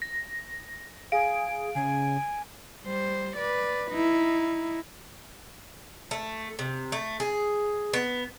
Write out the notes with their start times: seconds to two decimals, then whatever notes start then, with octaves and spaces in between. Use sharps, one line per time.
0.02 A#6
1.12 G#4 F5 G#5 D7
1.75 C#3 G#5
2.84 G3 C5
3.36 B4 D5
3.91 D#4 E4
6.11 A3
6.59 C3
6.92 A3
7.20 G#4
7.93 B3